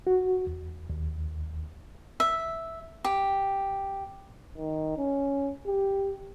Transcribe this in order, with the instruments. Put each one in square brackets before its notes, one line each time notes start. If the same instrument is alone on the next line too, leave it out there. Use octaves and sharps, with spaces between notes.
[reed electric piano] F#4
E2
D#2
[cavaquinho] E5
G4
[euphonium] D#3
C#4
G4